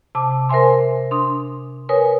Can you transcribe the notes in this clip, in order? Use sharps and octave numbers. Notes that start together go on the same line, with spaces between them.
C3 A5 D6
A#4 C5 E5 G#5 C6
D4 C6 D#6
A#4 B4 C#5 G#5 D#6